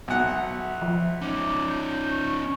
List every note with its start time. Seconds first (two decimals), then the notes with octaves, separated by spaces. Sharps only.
0.08 B1 E5 F#5
0.82 F3
1.22 C#4 D#4 D6
1.69 G6
2.10 C#6